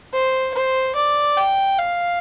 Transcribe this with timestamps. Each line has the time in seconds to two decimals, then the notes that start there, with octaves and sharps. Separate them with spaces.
0.13 C5
0.54 C5
0.95 D5
1.37 G5
1.78 F5